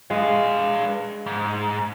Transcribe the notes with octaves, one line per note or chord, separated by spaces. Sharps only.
G#3 B4 F5
G#2